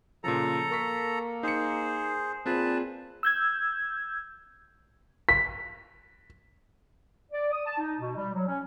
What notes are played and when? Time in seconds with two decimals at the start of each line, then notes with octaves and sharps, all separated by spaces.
0.24 A#2 C#3 F3 A4 A#5
0.71 A#3 A#4 C#6 B6
1.43 D#4 G#4 C5 C#7
2.46 A#2 C4 F4 G#4 B4 A5
3.23 E6 G6 G#6
5.29 B6
7.32 D5
7.52 D#6
7.66 A5
7.78 D#4
7.99 B2
8.16 G3
8.33 F#3
8.47 C#4